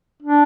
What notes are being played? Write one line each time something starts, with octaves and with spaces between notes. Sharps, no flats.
D4